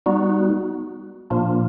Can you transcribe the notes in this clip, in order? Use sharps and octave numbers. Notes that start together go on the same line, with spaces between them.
G3 B3 D#4 F#4
A#2 F3 A#3 D4 F4